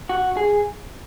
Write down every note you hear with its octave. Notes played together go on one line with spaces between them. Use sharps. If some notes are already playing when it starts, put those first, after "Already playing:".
F#4
G#4